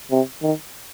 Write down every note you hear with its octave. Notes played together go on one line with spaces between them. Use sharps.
C3
D#3